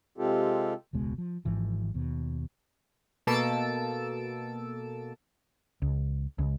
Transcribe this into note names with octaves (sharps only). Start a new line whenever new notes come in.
C3 G#3 C4 F4 G4 A4
E1 C#2 B2 G#3
F3
G#1 G#2 E3 F3
D#2 B2
B2 A#3 A4 A5 E6 D7
C#2
C#2